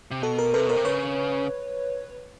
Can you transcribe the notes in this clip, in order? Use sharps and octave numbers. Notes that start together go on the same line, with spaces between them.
C3
B2 A4
A#4
C3 A4 B4
B2 A#4 C5
C3
C#3 B4 C#5